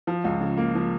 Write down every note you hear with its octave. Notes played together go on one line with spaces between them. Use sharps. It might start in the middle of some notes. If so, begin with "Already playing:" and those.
F3
C#2
C#3
A#3
F3